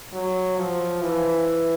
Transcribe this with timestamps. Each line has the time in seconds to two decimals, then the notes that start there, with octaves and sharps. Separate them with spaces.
0.13 F#3
0.58 F3
1.01 E3